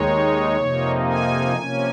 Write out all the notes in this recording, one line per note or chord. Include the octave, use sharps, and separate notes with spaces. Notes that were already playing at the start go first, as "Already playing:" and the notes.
Already playing: D#2 D#3 G#3 D#4 C#5
F2 C3 F3 A#3 D#4
G#5
C3 F3 A#3 C#4